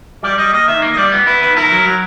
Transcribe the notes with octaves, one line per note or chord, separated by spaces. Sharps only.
G3 D5
G3 D#5
A#3 D#5
D#3 E5
A#3
D#5
G3 D5
B3
E4 B4
D#3 B4
E4 A#4
F#3
F#3